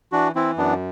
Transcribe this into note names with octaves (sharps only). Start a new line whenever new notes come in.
E3 D4 F#4
E3 C4 E4
F#2 B3 D4